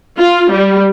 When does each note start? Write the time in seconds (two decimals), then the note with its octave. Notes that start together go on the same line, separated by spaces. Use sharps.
0.19 F4
0.51 G3